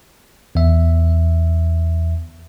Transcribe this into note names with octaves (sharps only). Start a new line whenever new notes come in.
E2 E5